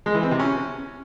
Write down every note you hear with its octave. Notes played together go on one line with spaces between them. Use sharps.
G#3
E3
C4
C3
C#4